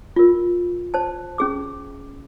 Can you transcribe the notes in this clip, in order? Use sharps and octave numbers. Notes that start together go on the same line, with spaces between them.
F4 A#4
C5 A5
C#4 G#4 D6